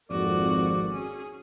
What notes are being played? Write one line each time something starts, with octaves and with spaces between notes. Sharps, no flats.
G#1 F2 A#3 F#4 D5
C#4 G#4